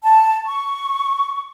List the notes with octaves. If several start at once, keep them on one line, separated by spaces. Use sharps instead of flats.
A5
C#6